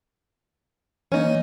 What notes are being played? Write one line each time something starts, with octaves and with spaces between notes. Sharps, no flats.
E3 A#3 C#4 D#4